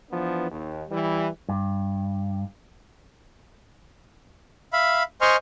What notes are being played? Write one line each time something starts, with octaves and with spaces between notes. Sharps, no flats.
E3 F3 B3 D4
D#2
E3 G3
G2
E5 F5 B5
C5 D#5 G#5 C6 C#6 F6